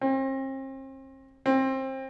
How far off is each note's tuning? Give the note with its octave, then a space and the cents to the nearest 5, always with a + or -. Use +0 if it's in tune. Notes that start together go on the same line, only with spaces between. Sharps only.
C4 +40
C4 +25